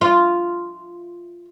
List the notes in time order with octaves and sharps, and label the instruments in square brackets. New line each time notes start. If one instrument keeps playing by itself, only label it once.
[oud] F4